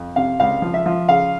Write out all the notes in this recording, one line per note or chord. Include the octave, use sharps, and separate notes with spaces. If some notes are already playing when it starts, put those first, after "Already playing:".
Already playing: F2
C3 F5
C#2 F5
F3
E5
F3
C#3 F5